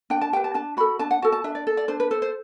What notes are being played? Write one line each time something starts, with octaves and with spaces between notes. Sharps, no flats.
D4 G5
A5
G4 B4 G5
A5
D4 A5
F#4 A4 B5
D4 A5
F#5
F#4 A4 A5
A5
D4 E5
D5
A4
D5
D4 C5
B4
A4 C5
C5